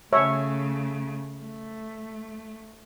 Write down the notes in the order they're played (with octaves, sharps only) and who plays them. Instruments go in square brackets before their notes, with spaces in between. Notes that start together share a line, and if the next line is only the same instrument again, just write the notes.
[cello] C#3 A3 [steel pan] C#5 E5
[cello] A3